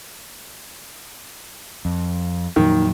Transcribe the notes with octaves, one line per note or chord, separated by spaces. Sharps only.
F2
F2 A#2 D#3 F#3